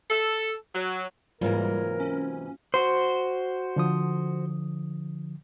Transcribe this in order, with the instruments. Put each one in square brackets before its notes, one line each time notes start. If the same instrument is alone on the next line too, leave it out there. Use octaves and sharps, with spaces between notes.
[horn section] A4
F#3
[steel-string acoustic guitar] G#2 C3 E3 [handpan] F#3 A#3 F4 [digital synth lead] G3 [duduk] A#4
[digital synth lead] C#4
[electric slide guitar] F#4 C5
[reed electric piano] D3 F3 D#6